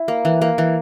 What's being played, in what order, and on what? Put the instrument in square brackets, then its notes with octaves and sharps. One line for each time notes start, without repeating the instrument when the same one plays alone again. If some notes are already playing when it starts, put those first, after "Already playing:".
Already playing: [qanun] E4 [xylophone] E5
[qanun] A#3
E3
A#3
E3